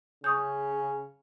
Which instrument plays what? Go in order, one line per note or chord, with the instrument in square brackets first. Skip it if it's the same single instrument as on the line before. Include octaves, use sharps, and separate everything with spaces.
[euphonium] C#3 [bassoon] C#4 [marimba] C#6 D#6 G6